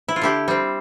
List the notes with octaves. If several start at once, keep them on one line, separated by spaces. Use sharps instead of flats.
E4
F4
D3 E4 G4
G3 C4